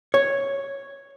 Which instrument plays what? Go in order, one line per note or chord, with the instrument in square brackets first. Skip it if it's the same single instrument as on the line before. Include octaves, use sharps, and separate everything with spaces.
[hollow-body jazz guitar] C#5